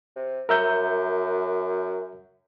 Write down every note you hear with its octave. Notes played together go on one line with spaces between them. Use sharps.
C3
F#2 A#4 E5 G6